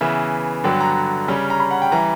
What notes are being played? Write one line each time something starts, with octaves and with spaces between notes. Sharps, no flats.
C#3 E3 B3 E5
G2 D3 F#3 G5
A#5
C#3 G3 C#4
A#5
B5
F#5
G5
E3 G3 A#5